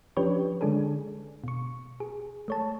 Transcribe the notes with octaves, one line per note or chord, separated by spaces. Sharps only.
F3 C#4 D4 G4 B4 C#5
D3 G#3 D4 G#4 A4
B2 C#6
G#4
A3 C#5 A5